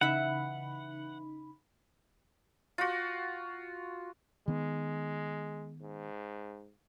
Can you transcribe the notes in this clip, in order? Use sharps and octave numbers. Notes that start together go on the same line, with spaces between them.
C#3 E3 D#4 E5 F#5 B5
F4 F#4
D#3 G#3 B3
G#2